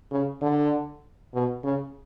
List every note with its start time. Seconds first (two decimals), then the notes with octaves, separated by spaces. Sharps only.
0.12 C#3
0.42 D3
1.35 B2
1.64 C#3